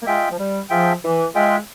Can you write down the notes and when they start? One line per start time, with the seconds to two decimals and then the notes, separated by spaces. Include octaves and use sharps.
0.01 A#3
0.06 G#3 F4 G#4 E5 G5
0.30 F3
0.38 G3
0.70 F3 F4 G#4 E5 G5
1.03 E3
1.34 G#3 F4 G#4 E5 G5